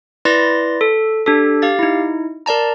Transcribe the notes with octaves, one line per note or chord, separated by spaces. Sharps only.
E4 B4 D5 C6 A6 A#6
A4
D4 G4 A4
G4 F5 A6
D#4 E4
A#4 D5 A5 A#5